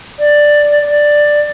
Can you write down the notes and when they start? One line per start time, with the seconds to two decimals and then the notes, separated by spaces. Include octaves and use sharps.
0.19 D5
0.83 D5